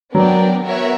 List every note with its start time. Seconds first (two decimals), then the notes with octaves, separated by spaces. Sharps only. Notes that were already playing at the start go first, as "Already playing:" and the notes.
0.14 F#3 B3 D4 A#4 D5 G5
0.65 B3 F#4 A#4 C#5 E5